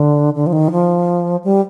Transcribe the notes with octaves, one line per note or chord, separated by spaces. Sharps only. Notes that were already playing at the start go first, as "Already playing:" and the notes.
Already playing: D3
D3
F3
D#3
F3
G3